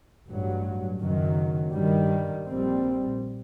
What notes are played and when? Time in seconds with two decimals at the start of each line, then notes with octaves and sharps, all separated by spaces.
0.28 A1 G2 F#3
1.01 F#1 F#2 D#3 F#3
1.73 G2 D#3 G3
2.45 A#1 A#2 G3 C4